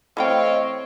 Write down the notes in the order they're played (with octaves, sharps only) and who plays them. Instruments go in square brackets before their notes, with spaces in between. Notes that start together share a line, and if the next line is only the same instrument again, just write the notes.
[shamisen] E3 A3 G5 [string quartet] C4 [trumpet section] C#5 F5 [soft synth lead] D#5